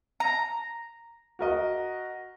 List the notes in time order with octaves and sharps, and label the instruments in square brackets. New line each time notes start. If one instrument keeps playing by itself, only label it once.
[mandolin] A#5
[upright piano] F#4 A#4 D#5